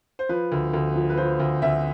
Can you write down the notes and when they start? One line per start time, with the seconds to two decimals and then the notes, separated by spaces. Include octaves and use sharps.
0.19 C5
0.29 F3 B4
0.52 D2
0.73 D2
0.96 F3
1.10 B4
1.17 F3 C5
1.40 D2
1.62 D2 E5